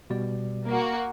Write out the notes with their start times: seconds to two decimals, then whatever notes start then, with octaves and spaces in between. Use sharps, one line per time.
0.10 B2 G3 D5
0.66 A#3 F#4